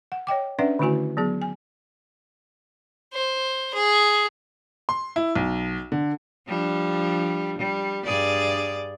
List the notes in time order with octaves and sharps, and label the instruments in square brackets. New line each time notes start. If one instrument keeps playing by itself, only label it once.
[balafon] F#5
C#5 D#5 G5 D6
C#4 D4 B4 D5 E5 F#5
D3 D#3 A3 E4 F#4 G#5
F#3 B3 G#4
G#5
[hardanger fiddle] C5
G#4
[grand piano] C6
E4
B1
D3
[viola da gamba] F3 G3 D4
G3
G2 G#4 D5